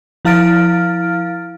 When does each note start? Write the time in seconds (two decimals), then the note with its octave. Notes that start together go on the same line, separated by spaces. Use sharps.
0.25 F3 E4 F5 F6 A6 D7